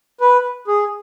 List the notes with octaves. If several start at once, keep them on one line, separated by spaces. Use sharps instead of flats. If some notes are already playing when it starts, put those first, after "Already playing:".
B4
G#4